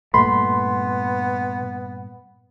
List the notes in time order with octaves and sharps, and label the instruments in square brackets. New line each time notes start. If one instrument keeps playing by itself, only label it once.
[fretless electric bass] G2 A#2 A3 [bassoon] B3 [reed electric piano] B5 C6